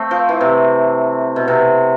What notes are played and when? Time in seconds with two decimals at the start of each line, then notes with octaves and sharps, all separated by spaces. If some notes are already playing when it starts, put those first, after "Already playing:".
Already playing: A3 C4
0.11 F3
0.29 E3
0.41 C3
1.36 B2
1.48 C3